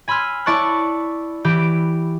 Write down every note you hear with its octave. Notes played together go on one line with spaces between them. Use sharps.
G#5 B5 C6 E6 F6
E4 D5 A5 C#6 F#6
E3 G4 B5 D7